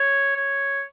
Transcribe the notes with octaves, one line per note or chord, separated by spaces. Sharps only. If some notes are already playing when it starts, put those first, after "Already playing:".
Already playing: C#5
C#5